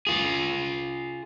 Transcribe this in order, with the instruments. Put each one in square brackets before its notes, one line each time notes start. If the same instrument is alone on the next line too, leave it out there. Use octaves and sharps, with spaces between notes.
[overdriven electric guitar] F4 G#4